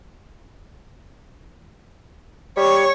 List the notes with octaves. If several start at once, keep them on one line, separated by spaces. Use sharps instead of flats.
G3 C#5 C#6